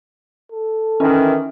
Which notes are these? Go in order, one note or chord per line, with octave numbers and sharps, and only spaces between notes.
A4
D#3 E3 C#4